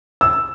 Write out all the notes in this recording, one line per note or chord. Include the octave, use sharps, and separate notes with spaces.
E6